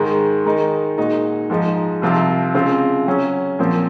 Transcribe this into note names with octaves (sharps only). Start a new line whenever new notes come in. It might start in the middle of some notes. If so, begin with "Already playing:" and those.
Already playing: G#2 D#3 G#3
D#3 G#3 D#4
A#2 G#3 D#4 F#4
G#2 F3 G#3 D#4
C2 C3 F3 C4 F4
C#3 G#3 C4 F4
C#3 F#3 C#4
A#2 F3 C4